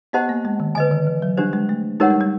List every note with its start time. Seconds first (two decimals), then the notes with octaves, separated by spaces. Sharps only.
0.13 B3 G4 C5 D#5 F#5 A5
0.29 A#3
0.45 G#3
0.60 D#3
0.75 D3 B4 D#5 G#5
0.91 D#3
1.07 E3
1.22 F#3
1.37 G3 D4 G4 C5
1.53 G#3
1.69 A3
2.00 G#3 D#4 G4 A#4 C#5 F#5
2.10 G3
2.21 G3